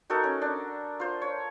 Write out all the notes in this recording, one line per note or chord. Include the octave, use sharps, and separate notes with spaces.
D#4 F#4 A4 A#4
C#4
D4
F4 C5
C#5